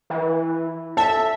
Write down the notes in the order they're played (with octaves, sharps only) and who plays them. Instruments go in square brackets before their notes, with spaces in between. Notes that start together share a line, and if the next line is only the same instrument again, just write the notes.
[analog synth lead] E3
[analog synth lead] E5 [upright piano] A5